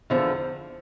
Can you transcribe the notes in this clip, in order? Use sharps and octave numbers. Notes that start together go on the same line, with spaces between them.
E2 D3 F3